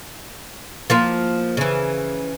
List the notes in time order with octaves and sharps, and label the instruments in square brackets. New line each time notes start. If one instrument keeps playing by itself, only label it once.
[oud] F3 A#3 F4
C#3 E3